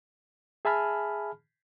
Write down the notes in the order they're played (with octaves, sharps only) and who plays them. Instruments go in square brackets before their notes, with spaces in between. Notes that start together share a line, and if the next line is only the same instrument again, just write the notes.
[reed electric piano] G#4 E5 G#5 A5 B5 F6